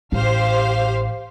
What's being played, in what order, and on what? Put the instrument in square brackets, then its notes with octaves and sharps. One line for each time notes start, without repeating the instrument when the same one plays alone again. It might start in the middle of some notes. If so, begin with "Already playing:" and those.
[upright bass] A1 [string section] G4 C5 F5